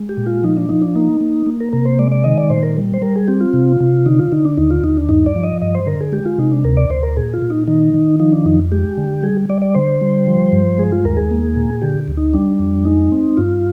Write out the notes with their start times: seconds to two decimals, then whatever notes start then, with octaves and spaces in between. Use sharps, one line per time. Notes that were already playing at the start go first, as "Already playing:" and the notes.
Already playing: G#3
0.09 G4
0.17 A#2
0.26 F4
0.43 F3 D#4
0.57 D4
0.69 F3 D#4
0.82 D4
0.95 A#3 D#4
1.21 A#3
1.46 A#3
1.60 A#4
1.73 C3 A#4
1.85 C5
1.99 G#3 D5
2.12 D5
2.24 D#3 D#5
2.38 D5
2.50 A#2 C5
2.63 A#4
2.77 G3
2.94 C5
3.02 G3 A#4
3.16 G#4
3.28 C4 G4
3.40 F4
3.53 C3
3.80 C3
4.06 D3 D#4
4.19 F4
4.32 D3 D#4
4.45 D4
4.57 D#2 D#4
4.70 F4
4.84 D#2 D#4
4.97 D4
5.09 G2 D#4
5.26 D5
5.36 F3
5.43 D#5
5.62 G2 D#5
5.75 C5
5.87 D3 A#4
6.00 G#4
6.12 G#3 G4
6.25 F4
6.38 C3 D#4
6.51 D4
6.64 D2 A#4
6.77 D5
6.90 D2 C5
7.03 A#4
7.17 A#2 G#4
7.34 F4
7.42 A#2
7.50 D#4
7.67 D#3 D#4
7.94 D#3
8.20 F3 D#4
8.32 D4
8.45 F2 D#4
8.72 G#3 G4
8.97 D3
9.23 G3 G#4
9.49 G3 D5
9.62 D5
9.75 D3 C5
10.01 G3
10.27 F3
10.52 G2
10.78 G#3 G#4
10.92 F4
11.04 D#2 A#4
11.17 G#4
11.31 A#3
11.56 A#2
11.82 D3 G4
12.08 D2
12.17 D#4
12.33 G3 D4
12.59 F2
12.85 G#3 D#4
13.12 C4
13.37 G2 F4